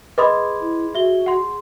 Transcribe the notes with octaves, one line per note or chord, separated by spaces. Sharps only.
G#4 B4 D#5 B5 C6 D6 D#6
E4
F#4 E5 G7
F#5 C6